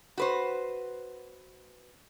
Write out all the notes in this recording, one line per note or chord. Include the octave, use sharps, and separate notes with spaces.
F#4 B4 C5